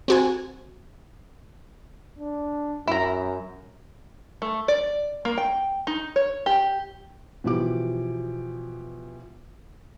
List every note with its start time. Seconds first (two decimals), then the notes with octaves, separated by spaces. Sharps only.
0.08 C4 F#4 G#5
2.19 D4
2.88 F#2 E4 A#5
4.42 A3
4.68 D5
5.25 A#3
5.38 G5
5.87 D#4
6.16 C#5
6.46 G4
7.44 B2 E3 F3 G4 D6